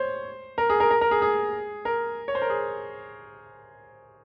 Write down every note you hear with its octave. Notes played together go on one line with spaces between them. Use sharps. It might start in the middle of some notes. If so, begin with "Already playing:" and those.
Already playing: C5 C#5
A#4
G#4
A#4
A#4
A#4
G#4
G#4
A#4
C#5
C5
A#4
G#4